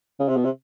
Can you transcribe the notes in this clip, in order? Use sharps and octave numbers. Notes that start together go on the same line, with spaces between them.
C#3
C3
B2
C3